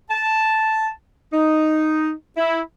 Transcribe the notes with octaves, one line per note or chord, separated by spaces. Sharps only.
A5
D#4
E4